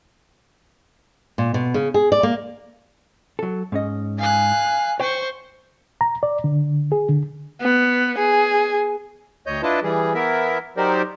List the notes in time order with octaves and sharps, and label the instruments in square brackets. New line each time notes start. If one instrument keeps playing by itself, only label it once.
[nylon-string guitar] A#2
B2
C#3
G#4
D5
A#3
[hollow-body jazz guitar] F#3 A4
G#2 C#4 D#5
[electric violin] F5 F#6 [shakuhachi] G#5
[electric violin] C5 C#6 [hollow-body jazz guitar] C#5 G5
[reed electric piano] A#5
D5
D3
G#4
D3
[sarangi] B3
G#4
[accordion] D2 C#5 D#5 G6
D4 E4 F4 B4 D#5 A5
E3 G3 G#4
E3 B3 E4 A#4 E5
F#3 D#4 G4 A#4 C5 D5